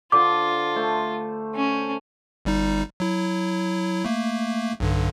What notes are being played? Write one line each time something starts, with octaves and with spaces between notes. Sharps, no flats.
D3 F4 C5 D6
A3 C5
C#4
G1 G3 D#4
F#3 E4
A3 A#3
B1 G2 D3